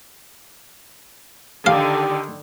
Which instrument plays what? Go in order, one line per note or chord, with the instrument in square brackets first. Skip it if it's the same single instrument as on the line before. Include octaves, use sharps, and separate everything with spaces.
[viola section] D3 D#3 [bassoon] G4 [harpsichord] F5